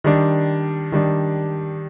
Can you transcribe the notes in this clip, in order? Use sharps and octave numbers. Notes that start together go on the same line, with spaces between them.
D#3 G3 D4
D#3 G3 D4